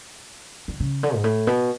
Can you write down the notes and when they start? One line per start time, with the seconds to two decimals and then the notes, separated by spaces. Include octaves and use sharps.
0.68 D3
0.80 C#3
1.03 D3
1.15 G#2
1.24 A2
1.47 B2